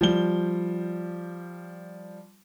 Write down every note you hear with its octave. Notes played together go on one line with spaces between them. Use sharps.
F3 G3 G7